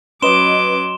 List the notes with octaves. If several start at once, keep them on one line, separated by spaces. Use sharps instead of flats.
F#3 C#4 B4 D#5 C6 D6 E7 G7